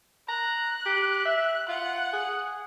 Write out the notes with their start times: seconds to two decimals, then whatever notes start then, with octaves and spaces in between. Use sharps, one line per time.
0.29 A#5 F#6
0.85 G4
1.25 E5
1.68 F4 F#5
2.13 G#4